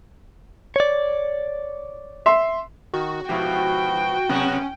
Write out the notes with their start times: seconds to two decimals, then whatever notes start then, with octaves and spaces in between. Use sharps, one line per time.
0.76 C#5 D5
2.26 E5 C6
2.94 D#3 F#4
3.29 G#2 B2 F3 B3 E4 G4 G5
4.29 C3 F#3 B3 C#4 F#4